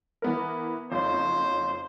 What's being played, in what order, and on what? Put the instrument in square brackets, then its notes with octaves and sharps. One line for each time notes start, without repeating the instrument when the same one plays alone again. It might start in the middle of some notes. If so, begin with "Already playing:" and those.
[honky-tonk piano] E3 B3 A#4
[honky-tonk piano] F#1 F2 C#5 [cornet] C5